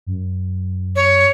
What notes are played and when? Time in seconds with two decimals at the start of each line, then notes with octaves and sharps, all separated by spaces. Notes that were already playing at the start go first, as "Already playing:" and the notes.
0.07 F#2
0.96 C#5